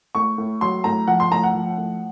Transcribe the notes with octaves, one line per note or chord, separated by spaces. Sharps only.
A2 C#6
A2
F#3 C6
A2 A#5
F3 F#5
C6
A2 A#5
F#5
F3
A2